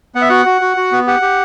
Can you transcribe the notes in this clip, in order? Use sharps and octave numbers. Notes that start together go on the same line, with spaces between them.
B3 F#5
E5
F#4 F#5
F#4
F#4
F#4
B3
G4 F#5
G4